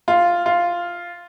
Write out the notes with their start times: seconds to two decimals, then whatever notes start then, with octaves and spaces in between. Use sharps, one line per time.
0.08 F4
0.46 F4